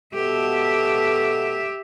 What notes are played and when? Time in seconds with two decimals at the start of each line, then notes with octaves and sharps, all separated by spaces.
0.14 B2 G4 A4 E5